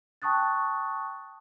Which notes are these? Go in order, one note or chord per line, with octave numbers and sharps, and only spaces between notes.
G5 A5 C#6 D#6 F#6 A6